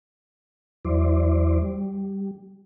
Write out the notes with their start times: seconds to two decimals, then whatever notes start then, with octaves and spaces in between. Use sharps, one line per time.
0.85 E2 F#3 E4 C5 D5
1.62 G3